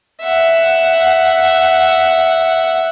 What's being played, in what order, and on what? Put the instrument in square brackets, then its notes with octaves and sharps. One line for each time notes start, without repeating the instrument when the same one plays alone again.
[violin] E5 F#5